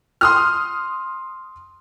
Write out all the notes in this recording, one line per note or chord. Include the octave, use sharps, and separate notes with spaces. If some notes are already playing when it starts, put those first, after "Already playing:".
C6 D#6 F6